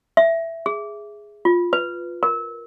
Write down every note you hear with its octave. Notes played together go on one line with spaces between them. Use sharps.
E5
G#4
F4
B4
A#4